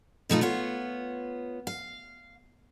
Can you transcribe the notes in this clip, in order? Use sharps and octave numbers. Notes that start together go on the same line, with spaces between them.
B2 A3 D#4 F4
B3 F4 C#5
F5